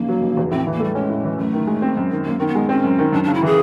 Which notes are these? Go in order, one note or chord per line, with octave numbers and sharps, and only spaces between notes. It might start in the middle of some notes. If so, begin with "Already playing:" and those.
Already playing: F1 E2 C#3 A#3
F#3
F1
E2
A2 C4
E3
A#3
G3 A3
G#3 C#4
A2
E3
F#2 A3
D#3
G#3
C4
F#2
D#3
F#2 A#3
D#3 C4
B3
G#3
C4 C#4
F#2
D#3
F#2 D4
C#3 D4
E4
E3 G#4